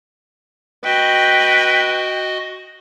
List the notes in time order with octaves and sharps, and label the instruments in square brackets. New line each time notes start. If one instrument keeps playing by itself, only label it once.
[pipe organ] F#4 D#5 [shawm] B4 [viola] G5